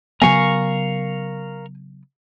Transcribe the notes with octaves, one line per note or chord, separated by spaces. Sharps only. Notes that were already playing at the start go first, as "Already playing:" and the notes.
C#3 F#3 B3 A#4 F5 G#5 C#6